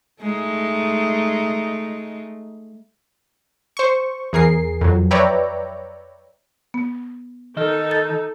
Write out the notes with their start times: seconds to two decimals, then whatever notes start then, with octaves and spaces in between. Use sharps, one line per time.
0.22 G#3 A3 D#4
3.77 C5 C#6
4.33 E2 G#4 A#4 C7
4.81 F2 F#3
5.11 B4 C#5 D5 E5 G5 A#5
6.74 B3
7.57 D#3 D#4 A4 D#5
7.91 A6